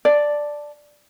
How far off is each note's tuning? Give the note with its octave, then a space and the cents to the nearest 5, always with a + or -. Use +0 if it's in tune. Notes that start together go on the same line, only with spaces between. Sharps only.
D5 +0 A5 +0